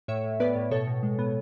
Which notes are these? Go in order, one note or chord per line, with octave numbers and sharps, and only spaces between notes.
A2 C#5 E5
A2
B3 B4 D5
A2
B2 A4 C#5
B2
G#3
B3